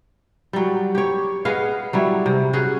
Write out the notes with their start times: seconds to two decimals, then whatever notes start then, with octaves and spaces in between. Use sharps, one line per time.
0.53 F#3 G3
0.95 G4 C#5
1.45 B3 G#4 D#5 F5
1.93 F#3 G3 E4
2.26 C3
2.53 C#4 F#4 G#4